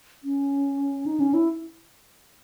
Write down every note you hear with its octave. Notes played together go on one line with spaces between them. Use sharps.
C#4
D#4
C#4
E4